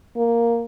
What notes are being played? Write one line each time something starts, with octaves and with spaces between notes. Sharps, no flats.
A#3